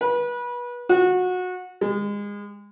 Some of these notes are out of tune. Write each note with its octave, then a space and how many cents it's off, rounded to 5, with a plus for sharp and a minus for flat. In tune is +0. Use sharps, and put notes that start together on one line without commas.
B4 -25
F#4 -20
G#3 -30